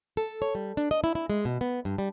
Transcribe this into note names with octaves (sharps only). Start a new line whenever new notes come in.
A4
C#5
G3
D4
D#5
E4
E4
G#3
B2
B3
G2
G3